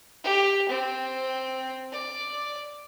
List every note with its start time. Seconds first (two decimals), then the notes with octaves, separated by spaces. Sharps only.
0.24 G4
0.69 C4
1.92 D5